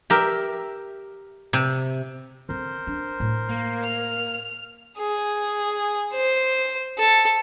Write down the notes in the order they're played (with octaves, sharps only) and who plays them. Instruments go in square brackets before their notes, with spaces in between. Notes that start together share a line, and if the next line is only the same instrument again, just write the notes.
[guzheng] G4 A#4 E5
C3
[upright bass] D3 C4 [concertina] A#4 C5
[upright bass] D4
A2
[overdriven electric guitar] A#3
[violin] F6
[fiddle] G#4
C5
A4